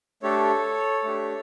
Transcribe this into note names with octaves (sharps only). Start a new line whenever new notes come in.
A3 D4 G4 A4 C#5
A3 D4 G4